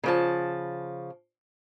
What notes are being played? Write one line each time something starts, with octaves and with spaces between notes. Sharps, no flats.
C#3 F3 A5